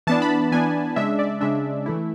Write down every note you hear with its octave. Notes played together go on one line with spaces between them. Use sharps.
E3 B3 D4 A5
B5
E3 B3 D4 G#5
C#3 G#3 D4 E5
D5
C#3 G#3 D4 E5
E3 A3 E4